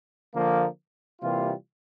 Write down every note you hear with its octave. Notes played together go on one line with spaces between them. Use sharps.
D3 F3 A#3
C3 E3 G3 A#3 F4